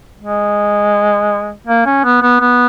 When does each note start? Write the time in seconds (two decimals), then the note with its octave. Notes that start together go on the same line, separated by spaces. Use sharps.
0.20 G#3
1.67 A#3
1.86 C#4
2.04 B3
2.22 B3
2.40 B3